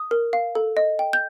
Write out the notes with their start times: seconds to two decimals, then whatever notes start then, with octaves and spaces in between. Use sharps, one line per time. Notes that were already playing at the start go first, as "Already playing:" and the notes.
Already playing: D#6
0.11 A#4
0.33 F5
0.55 A4
0.77 D#5
0.99 G5
1.13 G6